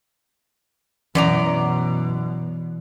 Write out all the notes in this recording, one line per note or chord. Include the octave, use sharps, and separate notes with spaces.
F#2 B2 E3 D5 A#5